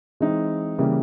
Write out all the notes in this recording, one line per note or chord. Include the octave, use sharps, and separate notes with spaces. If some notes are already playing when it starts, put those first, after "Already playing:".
E3 G#3 C4 D#4
C#3 E3 G3 A#3